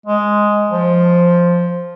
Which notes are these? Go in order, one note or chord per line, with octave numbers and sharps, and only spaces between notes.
G#3
F3